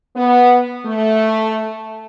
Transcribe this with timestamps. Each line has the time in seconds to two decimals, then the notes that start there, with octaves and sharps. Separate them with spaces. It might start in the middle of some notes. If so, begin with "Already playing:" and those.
0.16 B3
0.86 A3